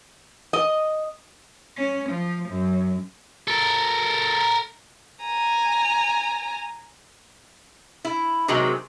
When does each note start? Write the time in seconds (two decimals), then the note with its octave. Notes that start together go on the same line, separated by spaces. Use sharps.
0.53 D#5
1.77 C#4
2.09 F3
2.49 F#2
3.48 A4 A#4
5.25 G#5 A#5
8.05 E4
8.48 C3 D#3 F#3 G#3 C4